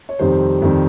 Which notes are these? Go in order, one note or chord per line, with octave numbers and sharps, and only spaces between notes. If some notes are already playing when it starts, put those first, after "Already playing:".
C#5
F2 C3 D#3 G3 C5
F2 C3 D#3 G3